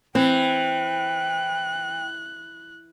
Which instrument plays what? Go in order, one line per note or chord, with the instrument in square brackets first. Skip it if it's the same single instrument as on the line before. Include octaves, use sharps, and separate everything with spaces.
[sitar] E3 [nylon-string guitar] C4 [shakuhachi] G5 [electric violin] F#6